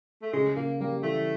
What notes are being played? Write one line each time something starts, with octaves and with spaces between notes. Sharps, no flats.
A3
C#3 G#3
C#3 A#3
G3 A#3
E3 A3